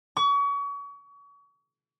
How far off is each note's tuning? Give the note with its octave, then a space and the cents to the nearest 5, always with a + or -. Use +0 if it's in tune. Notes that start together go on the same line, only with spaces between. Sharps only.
C#6 +35